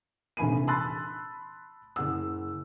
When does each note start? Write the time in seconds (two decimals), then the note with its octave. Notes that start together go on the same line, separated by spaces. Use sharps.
0.37 F1 A#1 E3 G#5 B5 D#7
0.67 A5 B5 C6 E6 F#6 A6
1.96 F#1 F#5 E6